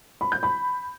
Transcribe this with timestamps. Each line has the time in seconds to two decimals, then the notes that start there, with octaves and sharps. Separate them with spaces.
0.21 B5
0.32 G6
0.43 B5